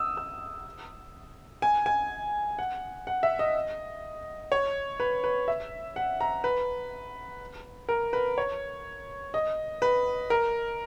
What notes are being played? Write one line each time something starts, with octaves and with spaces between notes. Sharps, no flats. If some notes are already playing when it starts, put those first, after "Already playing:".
Already playing: D#6 E6
E6
G#5
G#5
F#5
F#5
E5
D#5
C#5
B4
B4
E5
F#5
A#5
B4
A#4
B4
C#5
D#5
B4
A#4